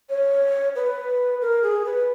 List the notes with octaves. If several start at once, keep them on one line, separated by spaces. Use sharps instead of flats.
C#5
B4
A#4
G#4
B4